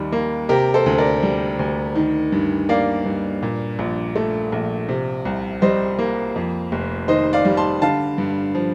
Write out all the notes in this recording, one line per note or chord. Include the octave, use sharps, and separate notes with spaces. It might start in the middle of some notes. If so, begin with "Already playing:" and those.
Already playing: D#2 D#3 G3
A#3
C3 G4 A#4
A4 C5
D2
A#4 D5
G3
D2
D#3
G2
A#3 D5 F5
G2
A#2
A#1
A3
A#1
C3
C2
G3 C5 D#5
A#3
F2
F1
D#3 C5 D#5
D5 F5
G3
A5 C6
D3 F5 A5
G2
F3